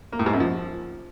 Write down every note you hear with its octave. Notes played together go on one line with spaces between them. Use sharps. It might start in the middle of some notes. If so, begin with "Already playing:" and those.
A#3
A2
G#2
F#2
F3